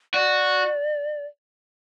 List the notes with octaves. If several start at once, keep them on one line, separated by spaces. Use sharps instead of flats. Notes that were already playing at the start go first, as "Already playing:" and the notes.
F#4 D5